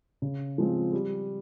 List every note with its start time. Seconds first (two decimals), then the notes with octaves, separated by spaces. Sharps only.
0.22 C#3
0.58 F3 G#3 C4
0.93 G3